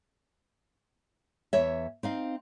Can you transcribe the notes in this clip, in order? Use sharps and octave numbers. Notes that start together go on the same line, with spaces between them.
E2 C#5 E5
C4 D#4 F5